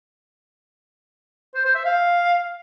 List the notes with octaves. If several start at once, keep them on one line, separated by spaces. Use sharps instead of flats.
C5
C5
E5
F5